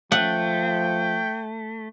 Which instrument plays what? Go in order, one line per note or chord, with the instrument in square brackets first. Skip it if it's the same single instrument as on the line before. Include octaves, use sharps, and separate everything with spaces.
[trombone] F3 [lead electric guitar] A3 [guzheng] F#5 [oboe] G5